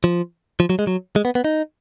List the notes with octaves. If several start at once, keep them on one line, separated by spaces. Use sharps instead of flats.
F3
F3
F#3
G#3
F#3
G#3
B3
B3
D#4